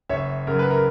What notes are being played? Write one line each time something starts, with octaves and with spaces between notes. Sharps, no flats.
F#1 C#5 E5
F#2 C#3 A#4
B4
A#4